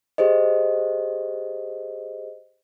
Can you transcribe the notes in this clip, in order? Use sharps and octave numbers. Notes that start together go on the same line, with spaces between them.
G4 G#4 C5 D#5